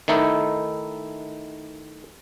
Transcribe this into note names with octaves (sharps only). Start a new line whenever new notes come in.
D#3 A3 D#4 E4